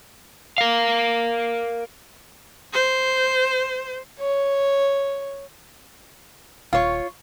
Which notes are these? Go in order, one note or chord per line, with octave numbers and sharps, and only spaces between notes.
A#4 F5
C5
C#5
D#1 F4 C#5